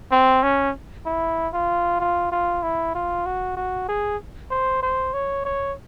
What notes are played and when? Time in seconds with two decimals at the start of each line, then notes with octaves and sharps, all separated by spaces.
0.12 C4
0.43 C#4
1.06 E4
1.54 F4
2.00 F4
2.32 F4
2.63 E4
2.95 F4
3.26 F#4
3.57 F#4
3.89 G#4
4.51 C5
4.83 C5
5.14 C#5
5.45 C#5